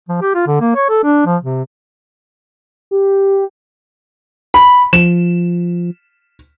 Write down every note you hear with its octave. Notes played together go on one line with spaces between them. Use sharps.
F3
G4
F4
D3
A#3
C#5
A4
D4
F3
C3
G4
B5
F3 E7